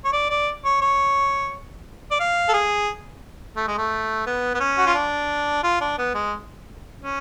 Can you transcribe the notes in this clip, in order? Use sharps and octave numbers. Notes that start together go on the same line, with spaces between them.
C#5
D5
D5
C#5
C#5
D5
F5
A4
G#4
A3
G#3
A3
B3
B3
C#4
F#4
F4
D4
F4
D4
B3
G#3
C#4